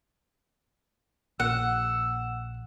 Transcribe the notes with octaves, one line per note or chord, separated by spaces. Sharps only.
A#1 F#5 E6